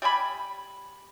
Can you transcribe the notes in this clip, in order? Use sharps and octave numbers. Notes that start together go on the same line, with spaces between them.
G3 D5 G#5 B5